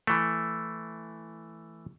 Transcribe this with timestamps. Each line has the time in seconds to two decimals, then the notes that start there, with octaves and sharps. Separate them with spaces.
0.07 E3 A3